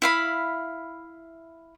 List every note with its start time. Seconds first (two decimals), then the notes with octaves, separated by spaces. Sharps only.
0.02 E4 F5 B5